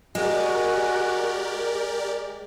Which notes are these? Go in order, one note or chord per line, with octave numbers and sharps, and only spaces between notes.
G#3 F#4 G4 A#4 D5